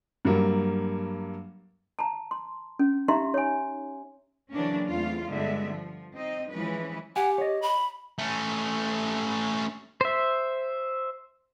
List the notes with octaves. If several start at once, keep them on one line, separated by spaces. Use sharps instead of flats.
G2 F#3 G3 A#3
A5 A#5
C6
C#4
D#4 G4 E5 F5 A#5 C6
C#5 G#5
C#3 E3 F#3 A#3 C#4 D4
E2 A3 C4 F4 F5
G2 D3 G#3 B3 E5
F3
C4 D#4 D#5
E3 F3 G#3 C#4 B4
G4 F#5 G#5
C#5 D#5
B5
A3 C#4
C5 E5